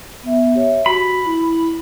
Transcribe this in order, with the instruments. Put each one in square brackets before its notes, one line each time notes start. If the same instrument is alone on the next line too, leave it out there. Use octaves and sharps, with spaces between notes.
[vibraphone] B3 E5
G4 C#5 E5
[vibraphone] F#4 [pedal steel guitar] B5
[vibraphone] E4